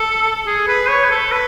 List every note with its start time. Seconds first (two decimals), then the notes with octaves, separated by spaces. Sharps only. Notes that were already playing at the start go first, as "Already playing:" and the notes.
Already playing: A4
0.47 G#4
0.68 B4
0.89 C#5
1.05 B4
1.11 A4
1.32 B4